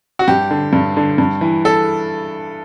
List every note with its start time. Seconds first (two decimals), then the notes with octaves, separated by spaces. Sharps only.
0.19 F#4
0.28 G2 G4
0.51 D3
0.73 G2
0.97 D3
1.18 G2
1.41 E3
1.65 A4